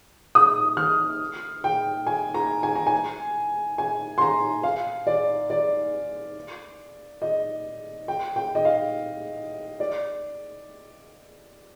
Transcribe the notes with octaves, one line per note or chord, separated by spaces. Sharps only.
D#6
F6
G5
G#5
A#5
G#5
A#5
G#5
G#5
C6
A#5
F5
D5
D5
D#5
G5
G5
D#5
F5
D5